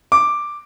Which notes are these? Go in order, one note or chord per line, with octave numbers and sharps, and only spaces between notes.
D6